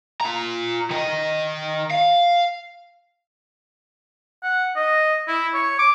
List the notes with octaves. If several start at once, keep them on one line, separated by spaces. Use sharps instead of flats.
F4 A#5
D#3 D#5
F5
F#5
D#5
E4
C#5
D6